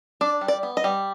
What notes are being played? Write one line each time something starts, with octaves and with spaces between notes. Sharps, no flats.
D4 D5
G3
D5
B3
D#5
G3